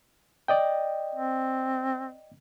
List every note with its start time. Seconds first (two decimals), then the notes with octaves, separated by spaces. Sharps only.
0.48 D5 D#5 G5
1.15 C4